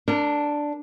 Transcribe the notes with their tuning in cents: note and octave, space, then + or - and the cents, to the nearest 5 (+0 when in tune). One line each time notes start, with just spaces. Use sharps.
D4 +0 A#4 -30